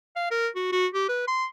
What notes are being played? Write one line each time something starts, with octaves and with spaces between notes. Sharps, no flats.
F5
A#4
F#4
F#4
G4
B4
C6